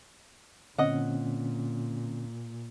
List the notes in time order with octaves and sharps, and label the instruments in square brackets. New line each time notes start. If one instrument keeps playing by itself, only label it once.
[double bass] A#2 [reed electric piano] D3 C4 C#4 [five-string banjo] D#5 F#5